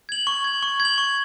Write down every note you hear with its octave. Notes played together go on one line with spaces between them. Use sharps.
G#6 F#7
C#6
G#6 F#7
C#6
G#6
F#7
C#6